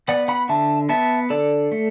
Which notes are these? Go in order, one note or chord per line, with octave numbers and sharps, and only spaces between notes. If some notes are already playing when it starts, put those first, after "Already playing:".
B3 D5 F#5
F#5 B5
D3 E5 A5
B3 E5 A5
D3 A4 D5
A3